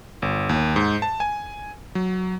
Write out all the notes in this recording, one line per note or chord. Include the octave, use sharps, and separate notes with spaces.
G1
D#2
G#2
A5
G#5
F#3